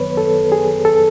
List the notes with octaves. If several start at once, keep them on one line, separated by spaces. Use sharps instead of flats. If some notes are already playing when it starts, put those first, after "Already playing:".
Already playing: F#2 D#3 F#3 B3 B4 C#5
A4
G#4
A4